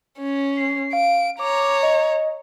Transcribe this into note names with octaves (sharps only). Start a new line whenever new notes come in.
C#4
C7
F5 D7
C#5 A#5 D6
D#5